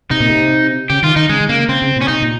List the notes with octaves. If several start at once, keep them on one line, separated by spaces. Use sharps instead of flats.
C3 D#4
A#2
C3
C#3 G4
D#3 F4
D#3 D#4
C#3 G#3
D#3
C#3 A#3
C#3 C4
C#3
A#2
C#4
C3 D#4
A#2